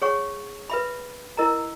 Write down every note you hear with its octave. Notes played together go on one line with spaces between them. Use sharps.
G#4 C#5 F#5 C#6
B4 E5 B5
E4 A#4 D#5 A#5